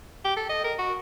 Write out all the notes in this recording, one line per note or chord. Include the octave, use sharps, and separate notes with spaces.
G4
A4
D#5
A#4
F#4